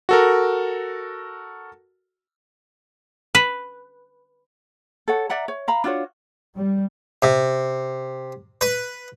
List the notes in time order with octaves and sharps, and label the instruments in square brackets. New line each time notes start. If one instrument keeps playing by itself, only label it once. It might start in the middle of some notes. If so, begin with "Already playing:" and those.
[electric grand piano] F#4 A4 A#4
[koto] B4
[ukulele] A4 C#5 F#5
D5 E5 F#5 A#5
C#5
F5 A#5 B5
D4 F4 F#4 C#5
[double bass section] G3
[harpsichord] C3
B4